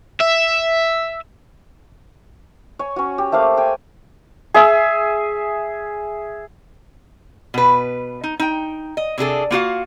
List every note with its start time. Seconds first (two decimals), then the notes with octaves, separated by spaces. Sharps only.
0.21 E5
2.79 C#5 G#5
2.96 C#4 F#4
3.18 G4
3.32 A3 A#3 C5 F5
3.57 G5 G#5
4.54 G#4 E5
7.54 B2 B4
8.24 D#4
8.39 D#4 G5
8.97 D#5
9.18 C3 D4 G#4 A4
9.51 A#3 F4 F#4 F5